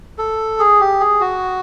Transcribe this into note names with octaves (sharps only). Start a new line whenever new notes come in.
A4
G#4
G4
G#4
F#4